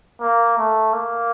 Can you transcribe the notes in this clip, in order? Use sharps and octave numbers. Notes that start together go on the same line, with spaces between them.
A#3
A3
A#3